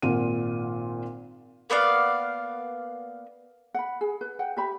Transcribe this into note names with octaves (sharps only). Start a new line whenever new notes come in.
G#1 A#2 F4 F#5 D#7
A#3 B3 D5 F5
F#5 B5
G#4
B4
F#5 G5
G4 E5 B5